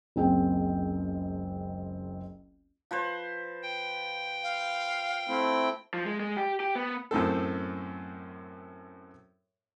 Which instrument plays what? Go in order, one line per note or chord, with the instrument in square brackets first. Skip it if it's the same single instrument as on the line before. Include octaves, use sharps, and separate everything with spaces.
[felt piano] F#1 C#2 C4 G#4 G5
[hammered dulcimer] F3 B4 C5
[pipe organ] G5
[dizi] F5
[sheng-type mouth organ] A3 C4 E4
[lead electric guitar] F3
G#3
G#3
G4
G4
B3
[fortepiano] F#2 A2 C4 A4